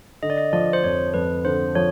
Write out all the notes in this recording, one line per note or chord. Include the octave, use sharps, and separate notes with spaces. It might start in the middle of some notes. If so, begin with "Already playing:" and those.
D3 D#5
D5
D#5
F3 D5
C5
F2 C#5
F2 B4
D3 C5
F3 C#5